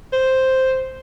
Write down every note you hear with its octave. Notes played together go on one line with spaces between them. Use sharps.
C5